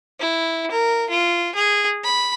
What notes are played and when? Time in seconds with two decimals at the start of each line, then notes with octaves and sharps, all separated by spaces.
0.20 E4
0.72 A#4
1.10 F4
1.56 G#4
2.04 B5